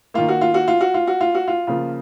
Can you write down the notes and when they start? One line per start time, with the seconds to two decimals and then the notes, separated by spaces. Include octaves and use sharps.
0.14 D#3 A#3 F4
0.28 F#4
0.41 F4
0.54 F#4
0.68 F4
0.81 F#4
0.94 F4
1.07 F#4
1.21 F4
1.35 F#4
1.48 F4
1.67 C#3 F3 A#3 F4